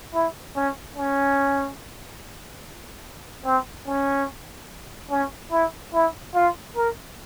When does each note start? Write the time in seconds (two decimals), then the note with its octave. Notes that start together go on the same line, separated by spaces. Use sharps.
0.14 E4
0.56 C#4
0.96 C#4
3.45 C4
3.87 C#4
5.11 C#4
5.51 E4
5.93 E4
6.35 F4
6.76 A#4